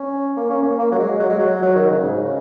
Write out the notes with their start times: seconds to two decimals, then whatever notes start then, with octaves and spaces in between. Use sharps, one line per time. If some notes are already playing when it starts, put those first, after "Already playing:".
Already playing: C#4
0.37 A#3
0.50 C#4
0.63 A#3
0.79 A#3
0.92 F#3
0.99 G#3
1.20 F#3
1.30 G#3
1.39 F#3
1.63 F#3
1.76 D#3
1.91 C#3
2.04 G#2
2.25 C#3